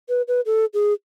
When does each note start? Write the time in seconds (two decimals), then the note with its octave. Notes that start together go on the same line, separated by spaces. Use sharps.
0.09 B4
0.28 B4
0.46 A4
0.74 G#4